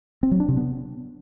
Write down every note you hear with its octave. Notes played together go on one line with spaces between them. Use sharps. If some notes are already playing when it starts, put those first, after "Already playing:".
C4
F#3
D4
C3
B3